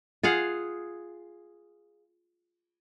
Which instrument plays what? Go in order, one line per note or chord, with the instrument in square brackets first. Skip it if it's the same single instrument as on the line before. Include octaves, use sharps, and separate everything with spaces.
[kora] F4 G#4 F5 F#5